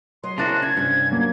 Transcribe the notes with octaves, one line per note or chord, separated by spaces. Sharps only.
F#3 D#5 C6
C#3 C4 D4 E4 F#4 A#4
C#4 G#6
G2 C3 C#4
F#3 A#3